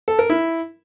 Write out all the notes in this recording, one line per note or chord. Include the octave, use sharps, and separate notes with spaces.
A4
A#4
E4